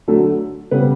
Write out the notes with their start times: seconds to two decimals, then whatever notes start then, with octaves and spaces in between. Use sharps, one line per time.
0.08 D2 D3 F#3 A3 A4
0.71 C#3 G3 B3 B4